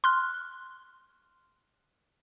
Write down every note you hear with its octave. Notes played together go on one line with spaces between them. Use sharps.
C6 F6 F#6